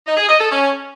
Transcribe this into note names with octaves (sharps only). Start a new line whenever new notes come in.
D#4
G#4
D#5
A4
C#4